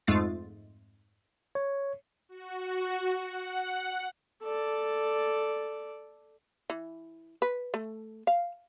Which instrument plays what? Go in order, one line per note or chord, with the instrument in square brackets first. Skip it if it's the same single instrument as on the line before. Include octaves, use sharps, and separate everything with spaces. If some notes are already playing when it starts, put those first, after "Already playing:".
[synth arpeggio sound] F2 G#2 G#3 A3 F4 A6
[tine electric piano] C#5
[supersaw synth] F#4
F#5
[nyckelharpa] A4 D5
[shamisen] E3
B4
A3
F5